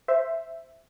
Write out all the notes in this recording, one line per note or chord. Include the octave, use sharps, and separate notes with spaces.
C5 E5